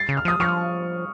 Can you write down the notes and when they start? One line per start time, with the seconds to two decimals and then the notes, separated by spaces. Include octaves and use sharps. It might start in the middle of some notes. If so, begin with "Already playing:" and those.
Already playing: A6 C7
0.09 C#3
0.17 F6
0.25 F3 D#6
0.40 F3 C#6 F6